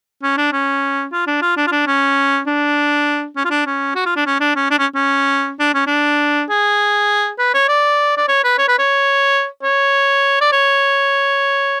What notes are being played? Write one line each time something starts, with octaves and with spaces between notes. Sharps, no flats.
C#4
D4
C#4
F4
D4
F4
D4
F4
D4
C#4
D4
C#4
F4
D4
C#4
F#4
F4
D4
C#4
D4
C#4
D4
C#4
C#4
D4
C#4
D4
G#4
B4
C#5
D5
D5
C#5
B4
C#5
B4
C#5
C#5
D5
C#5